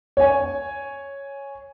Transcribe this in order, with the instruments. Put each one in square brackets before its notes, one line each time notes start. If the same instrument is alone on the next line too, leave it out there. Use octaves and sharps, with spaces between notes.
[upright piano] C#5 G#5